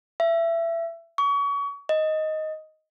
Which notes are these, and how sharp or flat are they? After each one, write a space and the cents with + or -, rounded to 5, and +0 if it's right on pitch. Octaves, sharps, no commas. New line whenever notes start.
E5 +25
C#6 +35
D#5 +5